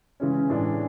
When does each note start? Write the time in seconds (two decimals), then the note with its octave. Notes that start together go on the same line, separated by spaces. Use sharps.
0.20 C#3 E3 G#3 C#4
0.50 A2 E3 G#3 D4